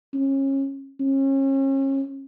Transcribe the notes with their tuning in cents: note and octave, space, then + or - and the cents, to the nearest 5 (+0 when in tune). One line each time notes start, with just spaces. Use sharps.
C#4 -30
C#4 -35